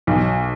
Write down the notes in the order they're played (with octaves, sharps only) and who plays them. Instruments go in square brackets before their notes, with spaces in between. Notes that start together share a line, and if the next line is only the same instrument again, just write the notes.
[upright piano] B1